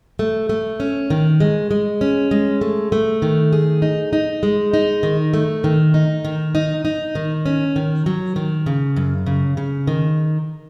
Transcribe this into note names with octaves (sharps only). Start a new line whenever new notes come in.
A3
A3
C#4
D#3
G#3
G#3
C#4
G#3
A3
A3
D#3
G#4
D#4
D#4
G#3
D#4
D#3
A3
D#3
D#4
D#3
D#4
D#4
D#3
C#4
D#3
F#3
D#3
C#3
F#2
C#3
C#3
D#3